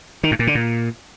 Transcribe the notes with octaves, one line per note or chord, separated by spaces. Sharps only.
D#3
A2
A#2
D3
A#2